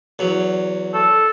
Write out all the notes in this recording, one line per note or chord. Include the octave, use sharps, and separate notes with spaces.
E2 F#3
A4